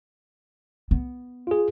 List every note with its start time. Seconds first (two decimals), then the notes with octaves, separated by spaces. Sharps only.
0.91 B3
1.47 F4 G#4